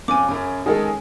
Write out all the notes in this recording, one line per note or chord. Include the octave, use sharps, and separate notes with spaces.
F2 C#4 G#5 D6
F#2 C#3 C#4
D#3 G#3 G#4 A4